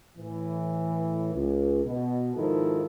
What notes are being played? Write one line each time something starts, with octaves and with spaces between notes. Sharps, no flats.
A2 E3
C#2
B2
G#2 D#3 F3 E4 A4